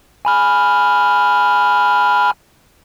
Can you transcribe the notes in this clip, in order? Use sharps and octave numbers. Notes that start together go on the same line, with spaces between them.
G#5 B5 F6